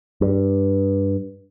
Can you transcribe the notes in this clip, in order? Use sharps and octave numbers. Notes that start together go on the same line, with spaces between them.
G2